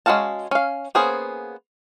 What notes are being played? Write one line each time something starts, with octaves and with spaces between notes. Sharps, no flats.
G#3 C#4 F#4 F5 A5
C#4 F5
A#3 B3 C#4 G#4 C5